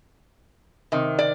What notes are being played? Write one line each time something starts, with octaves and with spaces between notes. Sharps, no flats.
C3 D#3
D5